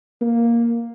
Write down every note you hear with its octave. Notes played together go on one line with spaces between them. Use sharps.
A#3